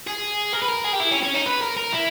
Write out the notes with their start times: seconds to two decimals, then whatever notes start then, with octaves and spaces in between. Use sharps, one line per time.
0.07 G#4
0.53 A#4
0.62 B4
0.69 A#4
0.84 G#4
0.93 G4
1.00 E4
1.11 C#4
1.23 C#4
1.34 D#4
1.46 B4
1.61 A#4
1.77 A#4
1.92 E4